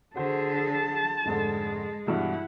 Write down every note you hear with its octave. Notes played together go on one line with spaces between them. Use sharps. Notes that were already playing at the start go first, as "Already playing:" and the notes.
D3 F#4 G#4 C5 A5
F1 G#2 D3 G#3
G2 B2 E3 E4 F#5